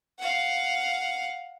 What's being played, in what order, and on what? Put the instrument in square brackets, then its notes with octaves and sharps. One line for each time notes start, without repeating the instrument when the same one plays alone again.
[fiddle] F5 F#5